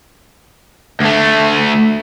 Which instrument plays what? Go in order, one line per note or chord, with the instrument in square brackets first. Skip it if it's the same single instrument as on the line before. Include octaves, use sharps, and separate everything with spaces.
[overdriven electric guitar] D2 A3